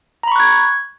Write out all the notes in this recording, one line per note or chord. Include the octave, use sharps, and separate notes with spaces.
A#5 B5 C#6 F#6 G#6